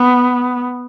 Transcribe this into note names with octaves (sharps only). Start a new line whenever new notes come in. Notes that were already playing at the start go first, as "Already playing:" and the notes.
Already playing: B3